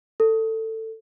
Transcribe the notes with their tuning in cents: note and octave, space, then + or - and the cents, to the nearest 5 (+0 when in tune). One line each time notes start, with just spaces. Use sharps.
A4 +15